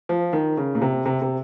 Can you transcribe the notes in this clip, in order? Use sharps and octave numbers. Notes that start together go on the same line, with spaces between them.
F3
D#3
C#3
A#2
C3
C3
C3